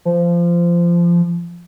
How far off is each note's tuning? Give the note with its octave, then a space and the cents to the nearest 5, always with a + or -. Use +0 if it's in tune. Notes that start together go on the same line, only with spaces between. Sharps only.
F3 -20